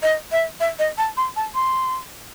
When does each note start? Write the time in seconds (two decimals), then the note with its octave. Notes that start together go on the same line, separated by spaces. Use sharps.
0.03 D#5
0.32 E5
0.60 E5
0.79 D#5
0.98 A5
1.17 C6
1.36 A5
1.55 C6